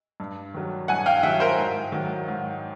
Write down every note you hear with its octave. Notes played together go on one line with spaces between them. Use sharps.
G2
D#3 F#3
G2 F#5 G#5
F5 G5
D#3 F#3 E5 F#5
A#4 C5
G#2
D#3 F#3
G#2